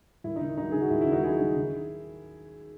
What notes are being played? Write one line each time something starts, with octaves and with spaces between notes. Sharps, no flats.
D#2 E4
D#4
D#3
F#3 D#4
D#3 G#4
F#4
D#2 E4
E4
D#3
D#4 F#4
F#3 E4 G#4
D#3
D#3